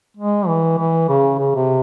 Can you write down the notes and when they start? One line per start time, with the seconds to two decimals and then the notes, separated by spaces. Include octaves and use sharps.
0.17 G#3
0.47 E3
0.78 E3
1.09 C#3
1.39 C#3
1.55 C3